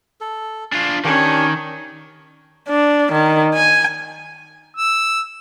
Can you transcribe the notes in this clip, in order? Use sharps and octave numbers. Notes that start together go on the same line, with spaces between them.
A4
D4 F4 G#5
D#3 C#4 D4 G4
D4
D#3
G#5
E6